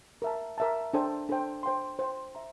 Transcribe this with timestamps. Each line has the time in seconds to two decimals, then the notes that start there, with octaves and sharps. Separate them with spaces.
0.22 A#4 E5 A5
0.58 A#4 E5 A5
0.94 D4 A4 C5 G5
1.29 D4 A4 C5 G5
1.63 C5 G5 C6
1.99 C5 G5 C6
2.35 E5 A#5